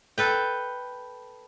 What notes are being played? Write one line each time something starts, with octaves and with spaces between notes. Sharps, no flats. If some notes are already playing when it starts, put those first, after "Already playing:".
A4 B4 G5